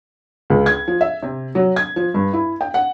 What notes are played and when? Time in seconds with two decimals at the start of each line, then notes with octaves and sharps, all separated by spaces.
0.50 C#2
0.66 G#6
0.88 F3
1.01 E5
1.23 C3
1.55 F#3
1.76 G#6
1.96 F3
2.14 G2
2.33 E4
2.61 G5
2.74 F#5